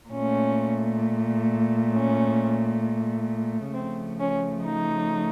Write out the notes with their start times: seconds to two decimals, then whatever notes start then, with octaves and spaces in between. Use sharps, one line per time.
0.10 A#2 C#4
0.16 A3
1.93 C#4
3.73 C#3 F3 A3 C4
4.19 C#4
4.65 D#4